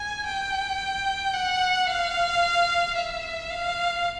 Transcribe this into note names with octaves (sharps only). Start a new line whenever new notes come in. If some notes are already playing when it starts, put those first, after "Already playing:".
Already playing: G#5
G5
F#5
F5
E5
F5